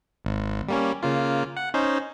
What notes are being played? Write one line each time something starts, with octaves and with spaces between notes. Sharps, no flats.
G#1
G3 A#3 C#4
C#3 A#3 F4
F#5
C#4 D#4 C5